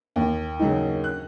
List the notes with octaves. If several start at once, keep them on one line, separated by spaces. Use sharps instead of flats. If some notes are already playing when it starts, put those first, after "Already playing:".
D#2
C#3 F#3 D#4
F#6